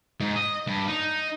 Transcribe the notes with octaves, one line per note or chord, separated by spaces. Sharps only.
G#2
D#5
G2
D#4